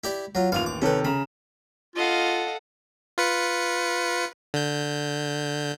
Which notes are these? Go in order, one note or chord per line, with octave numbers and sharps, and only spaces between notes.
E4 G4 D5
F#3 F4
A1 D#2 F4 F5 F7
D6
C3 D#3 C#4 A4 B4
C#3 A#5 B5
F4 A4 D#5 F5 F#5
F4 B4 C#7
D3 G6